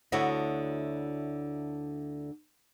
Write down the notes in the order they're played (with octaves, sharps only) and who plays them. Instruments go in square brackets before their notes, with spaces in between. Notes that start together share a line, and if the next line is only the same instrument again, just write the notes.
[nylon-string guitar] D2 D3 E4 F#4 C#5 D#5